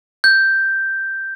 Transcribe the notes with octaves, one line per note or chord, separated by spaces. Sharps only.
G6